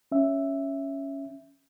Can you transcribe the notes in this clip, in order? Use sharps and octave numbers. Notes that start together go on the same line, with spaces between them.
C#4 E5